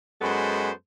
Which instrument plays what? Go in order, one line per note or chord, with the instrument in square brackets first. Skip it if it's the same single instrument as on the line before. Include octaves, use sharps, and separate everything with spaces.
[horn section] F#2 G#3 B3 A4 C5 B5